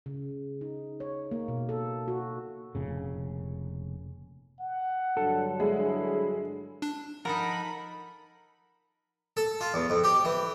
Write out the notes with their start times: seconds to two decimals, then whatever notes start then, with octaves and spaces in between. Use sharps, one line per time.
0.06 C#3
0.61 D#4
1.00 C#5
1.31 A#3
1.48 B2
1.69 A4
2.08 F#4
2.75 F1 A#2 C#3
4.60 F#5
5.17 G2 D3 F#3 A4
5.60 G#3 E4
6.82 D4
7.25 F3 D#4 A4 A#4 F#5 A#5 B5
9.37 A4
9.61 F4
9.74 E2
9.90 F2
10.04 G4
10.25 E3